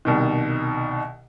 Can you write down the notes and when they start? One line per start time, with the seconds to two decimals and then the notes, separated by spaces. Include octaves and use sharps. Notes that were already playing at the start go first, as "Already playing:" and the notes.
0.05 C2 B2 D#3